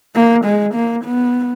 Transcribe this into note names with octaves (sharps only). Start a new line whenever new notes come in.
A#3
G#3
A#3
B3